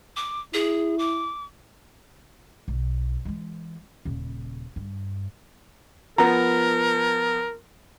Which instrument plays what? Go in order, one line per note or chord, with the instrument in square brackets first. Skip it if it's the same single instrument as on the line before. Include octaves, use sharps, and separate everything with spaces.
[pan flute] D6
[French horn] E4 [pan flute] G#4
[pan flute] D6
[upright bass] B1
E3 G#3
D#1 C#3
G2
[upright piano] F3 B3 [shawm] A#4 [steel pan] A#5